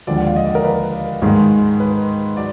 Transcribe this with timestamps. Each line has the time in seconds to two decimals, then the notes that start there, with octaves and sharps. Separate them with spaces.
0.07 D#2 D3 F3 G#3 D5
0.17 F#5
0.27 F5
0.36 D#5
0.45 D5
0.55 A#4
0.64 B4
1.22 G#2 D#3 G#3
1.80 B4
2.37 F#3 D5